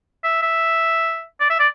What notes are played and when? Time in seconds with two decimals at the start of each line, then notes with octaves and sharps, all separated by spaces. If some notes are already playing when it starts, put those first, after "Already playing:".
0.24 E5
0.42 E5
1.40 D5
1.50 E5
1.59 D5